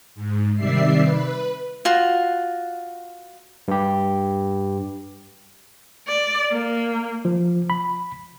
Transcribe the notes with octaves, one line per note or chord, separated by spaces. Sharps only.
G#2
C3 D#3 G3 D5 E5 C7
B4
F4 F#4
G2 G4
D5
A#3
F3
B5